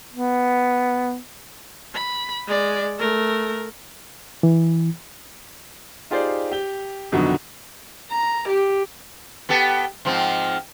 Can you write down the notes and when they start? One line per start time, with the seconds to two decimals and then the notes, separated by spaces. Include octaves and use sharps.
0.13 B3
1.94 B5
2.47 G#3 D5
2.99 A3 A#4
4.43 E3
6.10 D#4 F4 G4 G#4 C5 D5
6.52 G4 G7
7.12 A#1 F2 B2 D3 D#3 F#3
8.11 A#5
8.49 G4
9.49 B3 G4 A4
10.05 G#2 F3 C4